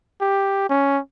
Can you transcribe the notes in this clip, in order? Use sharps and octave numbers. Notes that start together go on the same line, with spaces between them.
G4
C#4